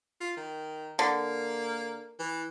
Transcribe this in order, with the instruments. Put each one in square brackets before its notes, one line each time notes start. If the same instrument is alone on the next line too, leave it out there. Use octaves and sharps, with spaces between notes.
[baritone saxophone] F4
D#3
[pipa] D3 [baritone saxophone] A#3
[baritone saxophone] E3